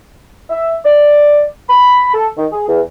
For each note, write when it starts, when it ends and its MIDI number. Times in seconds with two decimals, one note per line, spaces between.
0.49 0.76 76
0.85 1.43 74
1.69 2.10 83
2.14 2.28 69
2.37 2.46 51
2.52 2.65 68
2.67 2.80 40